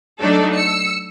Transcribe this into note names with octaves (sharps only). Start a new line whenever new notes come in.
F#3 A3 D4 D#4 A4 D5
E6 C#7